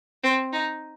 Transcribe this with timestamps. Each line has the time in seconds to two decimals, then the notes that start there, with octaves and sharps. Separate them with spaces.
0.23 C4
0.53 D#4